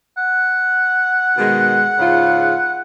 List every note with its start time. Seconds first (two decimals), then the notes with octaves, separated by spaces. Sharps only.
0.17 F#5
1.37 B2 D#3 G#3
1.99 G#2 C#3 F4